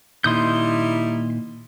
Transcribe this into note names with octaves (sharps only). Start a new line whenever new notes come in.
A#2 D#3 G3 D#4 E4 C6 D#6 G6